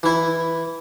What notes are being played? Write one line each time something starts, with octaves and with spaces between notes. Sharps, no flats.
E3 E4